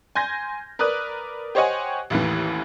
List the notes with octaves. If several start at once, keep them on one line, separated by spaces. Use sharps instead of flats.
G#5 C6 G6 G#6 A#6
A#4 B4 D5 D#6 F#6
G4 C5 C#5 D#5 F#5 G#5
A1 D#2 A2 E3